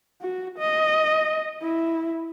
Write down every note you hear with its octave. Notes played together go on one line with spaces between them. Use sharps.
F#4
D#5
E4